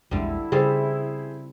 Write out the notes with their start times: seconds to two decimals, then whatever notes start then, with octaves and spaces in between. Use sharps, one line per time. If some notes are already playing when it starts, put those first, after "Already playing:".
0.11 A#1 E2 D3 G3 G#3 E4
0.52 C#3 G3 C4 G#4 A4 C5